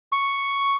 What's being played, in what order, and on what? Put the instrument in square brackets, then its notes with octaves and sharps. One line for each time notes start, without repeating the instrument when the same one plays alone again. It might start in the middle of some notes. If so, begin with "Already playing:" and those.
[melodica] C#6